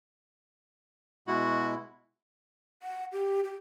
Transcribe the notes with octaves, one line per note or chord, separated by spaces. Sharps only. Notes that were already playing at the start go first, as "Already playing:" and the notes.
B2 G#3 E4 F#4
F#5
G4
G4